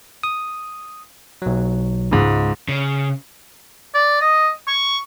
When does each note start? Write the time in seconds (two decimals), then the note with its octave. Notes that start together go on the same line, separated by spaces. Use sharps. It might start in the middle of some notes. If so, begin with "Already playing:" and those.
0.23 D#6
1.42 B1 F#3
2.11 C#2 G#2
2.69 C#3
3.94 D5
4.21 D#5
4.67 C#6